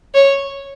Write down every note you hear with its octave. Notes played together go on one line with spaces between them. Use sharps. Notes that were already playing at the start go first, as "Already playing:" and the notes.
C#5